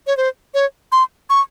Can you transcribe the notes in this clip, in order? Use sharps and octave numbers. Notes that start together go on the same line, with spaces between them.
C#5
C5
C#5
C6
C#6